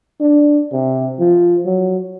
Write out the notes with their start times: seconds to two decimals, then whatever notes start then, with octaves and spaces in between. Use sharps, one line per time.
0.20 D4
0.72 C3
1.20 F3
1.65 F#3